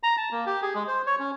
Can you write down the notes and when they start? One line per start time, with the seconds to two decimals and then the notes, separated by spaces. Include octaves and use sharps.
0.03 A#5
0.17 A5
0.32 A#3
0.46 G4
0.62 G#4
0.75 G#3
0.87 C5
1.06 C#5
1.19 C#4